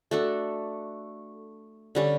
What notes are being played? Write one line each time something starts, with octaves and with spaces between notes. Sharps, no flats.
A3 D4 F#4 A4
D3 G3 C#4